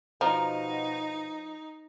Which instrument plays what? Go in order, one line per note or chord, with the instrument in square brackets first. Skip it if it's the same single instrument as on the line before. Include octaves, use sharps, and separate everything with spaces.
[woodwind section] B2 [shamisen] F3 [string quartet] D#4 [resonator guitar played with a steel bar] A#5